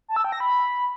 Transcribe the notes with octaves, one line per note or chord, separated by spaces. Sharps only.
A5
E6
G5
A#6
B5